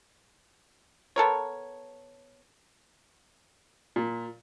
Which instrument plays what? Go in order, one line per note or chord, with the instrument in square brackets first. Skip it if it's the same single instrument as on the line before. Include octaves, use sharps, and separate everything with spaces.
[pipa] B3 A4 A#4 C#5
[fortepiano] A#2